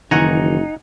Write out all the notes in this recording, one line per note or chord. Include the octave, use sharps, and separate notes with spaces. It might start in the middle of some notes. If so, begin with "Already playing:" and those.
F#1 D#3 E3 D#4 F#4 F#5 G#5 A#5